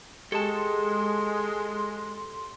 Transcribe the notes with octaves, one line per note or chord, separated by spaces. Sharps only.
G#3 G4 A4 A5 C6